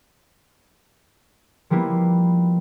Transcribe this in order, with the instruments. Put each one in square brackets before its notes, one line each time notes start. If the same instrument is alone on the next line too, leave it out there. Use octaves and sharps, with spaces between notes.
[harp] F3 G3 A#3 B3 E4